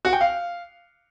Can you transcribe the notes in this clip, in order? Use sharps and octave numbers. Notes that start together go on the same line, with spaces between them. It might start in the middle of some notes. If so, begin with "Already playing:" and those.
F#4
G5
F5